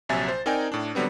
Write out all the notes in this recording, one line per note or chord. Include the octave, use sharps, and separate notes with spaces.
A#1 C3 F#3 E5 G#5 A6
C5
C4 D#4 A#4 D5 G5 G#5
A2 D4
D3 F#3 G3 B3 C4